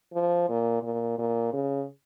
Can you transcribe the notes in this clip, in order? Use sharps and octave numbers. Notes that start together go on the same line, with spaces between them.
F3
A#2
A#2
A#2
C#3